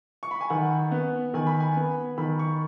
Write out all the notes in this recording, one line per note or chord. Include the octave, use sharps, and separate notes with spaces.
C#6
B5
G#5
D#3 F#5
B3
D#3 G#5
B5
G#5
B3
D#3 B5
C#6